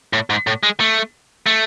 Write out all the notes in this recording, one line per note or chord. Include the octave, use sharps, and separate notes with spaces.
A2
G#2
A2
G#3
A3
A3